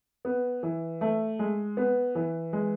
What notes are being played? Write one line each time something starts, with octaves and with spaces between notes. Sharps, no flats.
B3
E3
A3
G#3
B3
E3
G#3